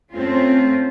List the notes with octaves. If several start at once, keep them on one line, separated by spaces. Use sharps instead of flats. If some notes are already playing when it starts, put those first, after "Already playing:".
A3 C4 C#4 F4